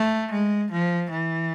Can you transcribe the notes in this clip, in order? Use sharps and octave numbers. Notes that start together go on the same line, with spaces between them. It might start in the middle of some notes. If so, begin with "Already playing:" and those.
Already playing: A3
G#3
F3
E3